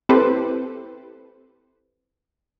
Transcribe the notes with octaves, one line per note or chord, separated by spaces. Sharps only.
C4 E4 G4 A4 B4 C5